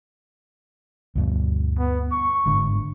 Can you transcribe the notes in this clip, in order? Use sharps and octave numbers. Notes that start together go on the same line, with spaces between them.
D2 G2 B2
B3
C#6
G1 G#2 D3